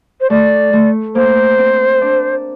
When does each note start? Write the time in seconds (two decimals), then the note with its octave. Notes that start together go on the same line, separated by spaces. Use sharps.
0.21 C5
0.30 A3 D5
0.73 A3
1.15 A#3 C5
1.58 C4
2.01 D4